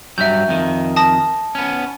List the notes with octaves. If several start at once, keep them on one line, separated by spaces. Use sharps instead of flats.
G2 F#3 E5 G6
F2 D#3
A5 D#6 A#6
B3 C#4